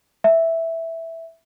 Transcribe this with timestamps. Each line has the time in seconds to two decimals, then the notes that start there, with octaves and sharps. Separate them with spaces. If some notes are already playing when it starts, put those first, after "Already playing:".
0.24 E5